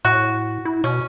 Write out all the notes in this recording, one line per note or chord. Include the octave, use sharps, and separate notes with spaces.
A2 F#4
E4
B2 C#4